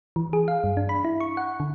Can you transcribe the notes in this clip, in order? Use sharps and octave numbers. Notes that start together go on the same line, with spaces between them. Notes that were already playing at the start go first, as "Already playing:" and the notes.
E3
G#4
F5
G2
D4
B5
E4
C#6
F#5
D3